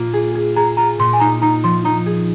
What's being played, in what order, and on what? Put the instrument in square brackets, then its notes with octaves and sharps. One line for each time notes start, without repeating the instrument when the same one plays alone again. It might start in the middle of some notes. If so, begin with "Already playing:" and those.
Already playing: [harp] A#2 A#3 F4
G#4
G#4
[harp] G#4 [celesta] A#5
[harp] F4 [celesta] A#5
[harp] A#2 [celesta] C6
[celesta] G#5
[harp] D#4 [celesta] A#5
[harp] D#4 [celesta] A#5
[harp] F3 [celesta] C6
[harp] D#4 [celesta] A#5
[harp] G#4